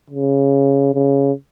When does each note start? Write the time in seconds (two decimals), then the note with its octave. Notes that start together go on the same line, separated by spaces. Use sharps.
0.10 C#3
0.94 C#3